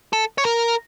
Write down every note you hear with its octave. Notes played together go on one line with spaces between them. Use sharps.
A4
C#5
A#4